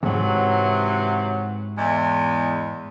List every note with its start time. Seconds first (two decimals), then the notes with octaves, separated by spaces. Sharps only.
0.03 D#2 G#2 C3 E3 F#3
1.78 E2 G#3 E4